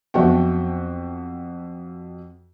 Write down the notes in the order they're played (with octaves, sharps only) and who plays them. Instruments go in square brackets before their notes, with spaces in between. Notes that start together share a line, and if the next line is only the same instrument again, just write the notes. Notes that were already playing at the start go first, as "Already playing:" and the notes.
[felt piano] F2 F#4 G5 [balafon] F#3 B3 D4